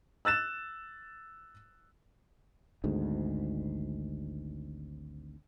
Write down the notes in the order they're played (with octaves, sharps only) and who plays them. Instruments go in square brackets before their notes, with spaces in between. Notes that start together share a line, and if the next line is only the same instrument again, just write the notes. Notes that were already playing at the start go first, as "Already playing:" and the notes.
[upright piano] E6 F#6 A6 E7
[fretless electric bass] G#1 D2 G#2